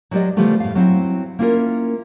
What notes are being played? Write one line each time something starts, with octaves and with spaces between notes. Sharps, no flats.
F#3 G#3 G4 G#4 D5 D#5
C#3 E3 F3 G3 A3 B3
A2 F5
F#3 C4 E4
A#3 C#4 E4 F4 G#4 A#4